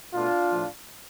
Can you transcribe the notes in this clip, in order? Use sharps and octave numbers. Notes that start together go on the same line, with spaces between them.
B2 A3 D4 F4
A2 F3 A3